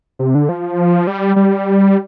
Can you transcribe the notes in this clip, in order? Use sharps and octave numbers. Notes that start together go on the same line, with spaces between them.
C3
D3
F3
G3
G3